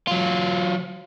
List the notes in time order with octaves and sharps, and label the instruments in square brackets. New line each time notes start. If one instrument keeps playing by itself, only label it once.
[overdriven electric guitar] F#3 F4